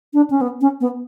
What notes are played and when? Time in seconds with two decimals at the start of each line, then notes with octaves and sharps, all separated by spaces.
0.14 D4
0.30 C#4
0.41 B3
0.61 C#4
0.81 B3